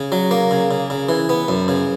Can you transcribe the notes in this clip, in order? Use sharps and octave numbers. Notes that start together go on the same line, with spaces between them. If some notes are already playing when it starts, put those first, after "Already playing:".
Already playing: C#3
F#3
A#3
C#3
C#3
C#3
E3
B3
F#2
C#3